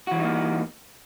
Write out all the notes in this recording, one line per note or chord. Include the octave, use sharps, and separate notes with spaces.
E3 G3 A#3 D#4 F#4